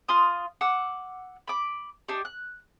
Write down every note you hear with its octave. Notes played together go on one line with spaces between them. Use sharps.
F4 C6 D#6
F#5 D6 E6
B5 D6
D4 D#4 G4
F#6